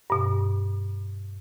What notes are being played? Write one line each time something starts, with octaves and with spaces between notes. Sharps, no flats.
G2 B2